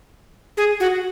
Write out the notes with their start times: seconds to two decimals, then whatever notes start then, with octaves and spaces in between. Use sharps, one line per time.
0.57 G#4
0.80 F#4